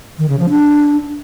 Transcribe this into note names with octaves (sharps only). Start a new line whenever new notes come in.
D#3
C#3
F3
D4